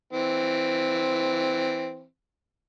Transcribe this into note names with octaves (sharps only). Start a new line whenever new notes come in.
E3 C4